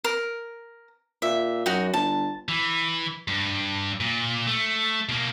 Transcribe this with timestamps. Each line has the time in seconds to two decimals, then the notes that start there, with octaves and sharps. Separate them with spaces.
0.04 A#4
1.22 A#2 E5
1.66 F#2 D#4 F#4
1.94 G1 A5
2.49 E3
3.28 G2
4.00 A#2
4.47 A3
5.09 B2 A#3